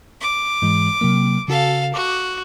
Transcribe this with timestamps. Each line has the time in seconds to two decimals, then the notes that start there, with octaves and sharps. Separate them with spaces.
0.21 D6
0.62 G#2 E3 G#3
1.01 C3 F#3 A#3
1.48 C#3 F#4 A4 F5
1.94 F#4 D6